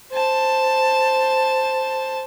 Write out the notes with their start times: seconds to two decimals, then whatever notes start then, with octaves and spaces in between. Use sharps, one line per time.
0.12 C5 A5